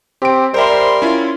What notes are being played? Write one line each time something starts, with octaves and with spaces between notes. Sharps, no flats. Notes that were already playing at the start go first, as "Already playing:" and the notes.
C4 G4 D7
G3 A#4 C5 E5 C6
C#4 E4 F4